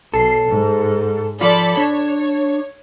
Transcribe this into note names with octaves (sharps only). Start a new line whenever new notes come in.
B1 A4 C7
G#2
F3 F4 A4 D5 B5
D4 C#5